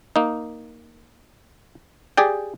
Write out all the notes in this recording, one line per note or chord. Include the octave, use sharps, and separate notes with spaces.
A#3 D#4
G4 G#4 D5 G5